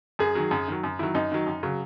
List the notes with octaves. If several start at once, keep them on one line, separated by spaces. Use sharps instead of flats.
F#2 G#4
D#3 F#3
F#2
D#3 F#3
F#2
D#3 F#3 E4
F#2 D#4
D#3 F#3
F#2
C#3 F#3